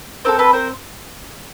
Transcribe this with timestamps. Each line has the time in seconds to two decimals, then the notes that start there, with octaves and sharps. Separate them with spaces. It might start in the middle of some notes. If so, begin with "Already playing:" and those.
0.25 C4 F4 A4 A#4 C5
0.39 A4 B4
0.53 A#4 C5